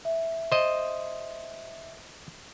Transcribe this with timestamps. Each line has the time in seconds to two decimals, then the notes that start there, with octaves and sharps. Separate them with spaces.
0.05 E5
0.52 C5 D#5